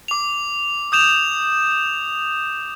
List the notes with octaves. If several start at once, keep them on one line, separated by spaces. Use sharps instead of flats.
D6 F7
D#6 G6 E7 F7